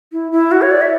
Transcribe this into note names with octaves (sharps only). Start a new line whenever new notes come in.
E4
E4
F#4
C#5
D5
E5